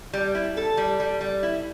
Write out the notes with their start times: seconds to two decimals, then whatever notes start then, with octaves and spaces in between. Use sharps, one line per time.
0.13 G3
0.35 E4
0.57 A4
0.77 G3
1.00 G3
1.21 G3
1.43 E4